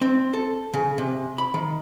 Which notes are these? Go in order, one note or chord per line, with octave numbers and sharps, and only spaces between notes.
C4
A4
C#3
C3
B5
D#3